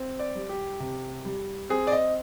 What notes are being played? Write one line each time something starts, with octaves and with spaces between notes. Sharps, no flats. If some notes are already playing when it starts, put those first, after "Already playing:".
Already playing: C4
D5
G3
G4
C3
G3
C4 G#4
D5
D#5